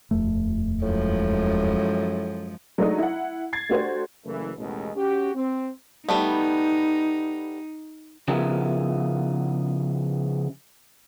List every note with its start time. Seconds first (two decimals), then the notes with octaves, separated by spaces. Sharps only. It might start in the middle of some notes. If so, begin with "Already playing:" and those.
0.11 D#1 F2 A3
0.82 F#2 A2 F3 G#3
2.78 F#3 G#3 A3 D4 D#4 D#5
2.98 E4 F#5
3.53 G#6 A6 C7
3.69 A3 D4 F#4 G4 C5
4.25 F#1 E3 A3 A#3
4.56 A1 D#2 B2 G#3
4.96 C#4 F#4 G4
5.35 C4
6.09 G3 A3 B3 D#4
8.28 C#3 F3 B3 E4 A#4